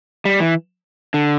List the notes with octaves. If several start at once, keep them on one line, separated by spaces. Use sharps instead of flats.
G3
E3
D3